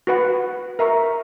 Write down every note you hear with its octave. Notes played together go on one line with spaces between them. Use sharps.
F#4 B4 F#5
A#4 E5 A#5 C#6